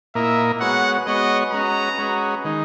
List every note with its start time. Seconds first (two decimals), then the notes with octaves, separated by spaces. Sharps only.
0.15 A#2 A#3 E4 A#4 D#5 E5
0.60 G#3 B3 F#4 C#5 F#5
1.07 G#3 B3 F#4 C#5 D#5
1.52 G#3 C#4 F#4 B4 D#5 A#5
1.99 G#3 C#4 F#4 B4 D#5
2.45 D#3 G#3 D#4